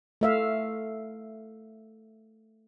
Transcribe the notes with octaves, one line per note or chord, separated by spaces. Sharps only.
A3 E5 F5